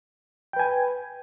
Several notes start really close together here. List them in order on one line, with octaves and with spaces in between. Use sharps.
G5 B4 G#5